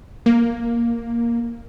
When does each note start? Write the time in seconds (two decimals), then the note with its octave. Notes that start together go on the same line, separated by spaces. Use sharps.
0.26 A#3